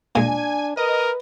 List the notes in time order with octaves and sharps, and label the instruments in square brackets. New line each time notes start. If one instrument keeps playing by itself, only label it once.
[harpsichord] A#2 G#3 [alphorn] D4 [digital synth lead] G#5
[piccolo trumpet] A#4 [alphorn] B4 [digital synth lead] D#5